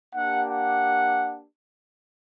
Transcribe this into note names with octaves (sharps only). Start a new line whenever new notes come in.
A#3 D4 G4 F#5
F#5